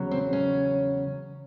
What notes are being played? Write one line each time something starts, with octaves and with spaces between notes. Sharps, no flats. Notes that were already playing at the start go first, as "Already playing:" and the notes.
Already playing: E2 C#3 F#3
C4
C#4